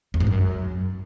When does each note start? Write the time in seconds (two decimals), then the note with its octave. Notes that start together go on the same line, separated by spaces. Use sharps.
0.14 E2
0.20 G#2
0.27 F#2